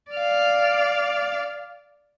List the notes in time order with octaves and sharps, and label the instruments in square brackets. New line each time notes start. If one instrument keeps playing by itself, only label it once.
[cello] D5 F5